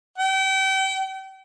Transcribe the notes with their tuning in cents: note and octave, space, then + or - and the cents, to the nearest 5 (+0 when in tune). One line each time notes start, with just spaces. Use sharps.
G5 -35